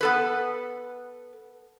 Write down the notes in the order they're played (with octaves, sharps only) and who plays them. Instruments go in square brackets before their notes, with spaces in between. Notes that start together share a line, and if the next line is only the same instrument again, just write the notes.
[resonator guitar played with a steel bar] B3 A4 B4